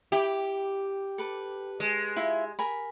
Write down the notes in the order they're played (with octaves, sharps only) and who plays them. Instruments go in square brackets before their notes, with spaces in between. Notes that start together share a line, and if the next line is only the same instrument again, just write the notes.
[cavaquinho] E4 [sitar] G4
[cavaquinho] A4 B4 D6
[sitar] G#3
[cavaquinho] E4 F4 E5
A#4 G#5 B5